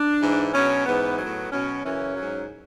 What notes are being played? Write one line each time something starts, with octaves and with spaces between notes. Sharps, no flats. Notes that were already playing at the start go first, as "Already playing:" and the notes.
Already playing: D4
G#2 E3
B2 F#3 C#4
G#2 E3 B3
A2 F#3 B3
B2 F#3 C#4
F#2 C#3 E3 C#4
G#2 F#3